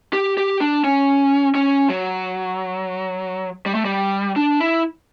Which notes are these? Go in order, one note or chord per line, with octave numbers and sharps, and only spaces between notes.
G4
G4
D4
C#4
C#4
F#3
G3
A3
G3
D4
E4